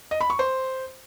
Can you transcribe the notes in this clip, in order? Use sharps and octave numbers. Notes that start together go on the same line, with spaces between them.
D#5
B5
C#6
C5